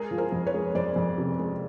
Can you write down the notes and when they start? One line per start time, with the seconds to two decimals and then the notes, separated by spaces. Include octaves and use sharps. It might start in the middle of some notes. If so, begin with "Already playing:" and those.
Already playing: G#3 G#4 A#4
0.11 F3
0.18 A#4 C5
0.32 F2
0.47 B4 C#5
0.54 G#3
0.75 F2 C5 D5
0.96 F2
1.18 C3
1.39 G#3